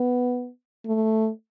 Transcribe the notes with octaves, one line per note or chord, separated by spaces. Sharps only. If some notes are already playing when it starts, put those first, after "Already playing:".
Already playing: B3
A3